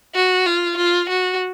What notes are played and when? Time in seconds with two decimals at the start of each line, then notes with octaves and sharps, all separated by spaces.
0.15 F#4
0.46 F4
0.77 F4
1.09 F#4